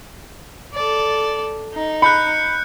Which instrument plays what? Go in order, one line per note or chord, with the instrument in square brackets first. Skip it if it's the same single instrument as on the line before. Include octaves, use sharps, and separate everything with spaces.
[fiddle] A4 D5
D#4
[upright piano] B5 [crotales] F#6 G6 C#7